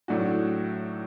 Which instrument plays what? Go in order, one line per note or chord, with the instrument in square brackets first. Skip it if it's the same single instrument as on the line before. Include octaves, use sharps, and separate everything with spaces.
[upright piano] A2 F#3 A3 D4 F#4